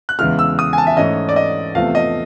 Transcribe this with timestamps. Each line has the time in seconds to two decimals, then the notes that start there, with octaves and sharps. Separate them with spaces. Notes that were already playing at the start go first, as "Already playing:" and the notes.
0.09 F#6
0.19 E2 C#3 E3 G#3 F6
0.39 E6
0.59 D#6
0.73 G#5
0.78 A5
0.87 E5
0.97 G#2 E3 A3 C#4 D#5
1.29 D5
1.36 D#5
1.75 E2 C3 F3 A3 F5
1.95 D#5